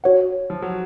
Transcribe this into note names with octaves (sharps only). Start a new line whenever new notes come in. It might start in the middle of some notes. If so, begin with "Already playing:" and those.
F#4 C#5 F#5
F3
F#3